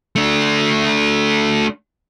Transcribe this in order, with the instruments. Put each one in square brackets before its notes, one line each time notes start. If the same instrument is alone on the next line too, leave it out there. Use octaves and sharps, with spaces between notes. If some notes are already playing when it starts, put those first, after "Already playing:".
[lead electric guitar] A3 D4